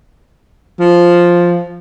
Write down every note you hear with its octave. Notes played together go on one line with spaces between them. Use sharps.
F3